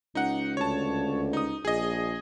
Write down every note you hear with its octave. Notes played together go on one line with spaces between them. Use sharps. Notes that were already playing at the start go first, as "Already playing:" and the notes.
C#2 D#4 F#5
D2 C#5 A5
D#4 D#6
A#1 G#4 D#5